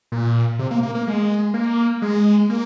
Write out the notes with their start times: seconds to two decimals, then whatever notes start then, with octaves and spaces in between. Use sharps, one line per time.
0.12 A#2
0.59 C3
0.71 A#3
0.83 A#3
0.95 A#3
1.07 G#3
1.54 A#3
2.02 G#3
2.49 A#3